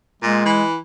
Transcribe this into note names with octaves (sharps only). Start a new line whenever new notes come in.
A#2 G#3
E3